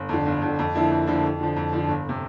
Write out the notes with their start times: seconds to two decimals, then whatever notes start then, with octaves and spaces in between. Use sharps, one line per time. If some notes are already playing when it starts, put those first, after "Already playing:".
Already playing: G1
0.09 F2 D3
0.26 G1
0.42 F2 D3
0.59 F2
0.75 D3 F3 A#3 E4
0.91 F2
1.07 D3 F3 A#3 E4
1.23 F2
1.40 D3 F3
1.56 F2
1.73 D3 F3
1.88 G1
2.09 C3